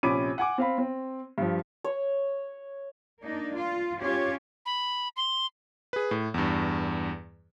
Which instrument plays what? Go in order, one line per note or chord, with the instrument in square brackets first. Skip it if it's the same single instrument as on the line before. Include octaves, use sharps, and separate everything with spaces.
[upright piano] A#1 C3 C#4 B5 D6 D#7
F#5 G#5 D6
C4 F5 B5
C4
G2 F3
[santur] C#5
[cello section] A#3 D4 D#4
F4
C#4 F4 G4 C#5
[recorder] B5
C6
[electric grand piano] G#4 B4
A2
E2 G2